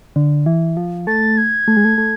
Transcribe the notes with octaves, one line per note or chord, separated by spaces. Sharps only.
D3
E3
F3
A3 A6
G#6
A3
G#3
A3
A3